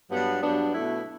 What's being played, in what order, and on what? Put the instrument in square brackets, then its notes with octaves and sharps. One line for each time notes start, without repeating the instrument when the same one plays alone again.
[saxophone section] G2 F#3 B3 D4
G2 F#3 B3 D4
B2 A3 E4